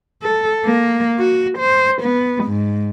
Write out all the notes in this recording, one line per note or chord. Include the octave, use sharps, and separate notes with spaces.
A4
A#3
F#4
C5
B3
G#2